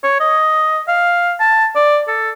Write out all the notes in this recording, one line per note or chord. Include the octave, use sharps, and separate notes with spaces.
C#5
D#5
F5
A5
D5
A4